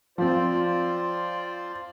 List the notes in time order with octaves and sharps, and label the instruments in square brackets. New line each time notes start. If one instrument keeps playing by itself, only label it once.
[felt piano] F3 C4 [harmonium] F4 C5 D5